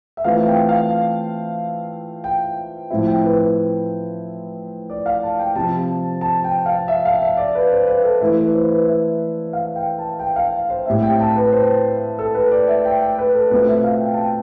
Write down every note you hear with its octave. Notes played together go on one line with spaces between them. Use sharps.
E5
E3 A3 C4 F4 F5
G5
F5
G5
A2 F3 C4 E4
G5
B4
B4
D5
F5
A5
G5
C3 F3 C4 A5
A5
G5
F5
E5
F5
E5
D5
B4
C5
B4
A4
E3 A3 E4 B4
B4
C5
B4
E5
F5
G5
A5
G5
F5
C5
A2 G3 C4 E4 E5
G5
A5
B4
C5
A4
B4
D5
E5
G5
G5
B4
A4
B2 A3 C4 F4 B4
E5
F5
G5
A5
G5